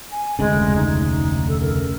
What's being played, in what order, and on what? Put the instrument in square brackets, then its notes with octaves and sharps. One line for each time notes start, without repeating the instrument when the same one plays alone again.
[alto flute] G#5
[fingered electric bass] F1 D2 C#3 [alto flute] G#3
[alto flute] D#4
A4
A#4